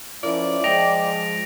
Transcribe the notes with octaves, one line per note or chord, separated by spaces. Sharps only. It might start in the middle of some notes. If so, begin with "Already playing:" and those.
F3 C#4 E4 A#4 D5
F3 G#3 D#5 G5 A#6 D7 F7